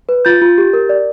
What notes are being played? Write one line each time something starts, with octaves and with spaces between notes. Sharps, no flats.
B4
F4 G6 A6
F4
G4
A#4
D5